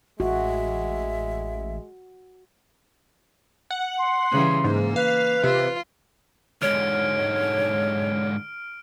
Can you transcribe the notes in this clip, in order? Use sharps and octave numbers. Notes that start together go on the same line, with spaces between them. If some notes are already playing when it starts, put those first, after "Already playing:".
A1 G#3 F#4 E5
F#5
C6
C#3 E3 G3
G#2 A#3
B4 F5
C3 F4
G#2 D3 C#5 F6 D7